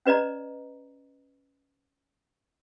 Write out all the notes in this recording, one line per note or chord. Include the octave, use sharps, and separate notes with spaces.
C#4 B4 D5 D#5 A#5